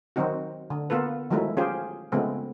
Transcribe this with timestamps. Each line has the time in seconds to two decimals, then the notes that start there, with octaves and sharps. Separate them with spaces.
0.16 D#3 F#3 C4 D#4 F#4
0.70 D3
0.90 A#3 B3 F4 A4 B4
1.30 D#3 F3 F#3 G#3 A3 E4
1.57 F3 C#4 F4 G4 G#4 C5
2.12 C#3 F3 G#3 A3 B3 C4